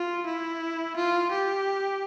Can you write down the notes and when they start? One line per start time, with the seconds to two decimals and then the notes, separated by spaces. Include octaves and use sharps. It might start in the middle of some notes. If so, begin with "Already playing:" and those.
Already playing: F4
0.26 E4
0.96 F4
1.31 G4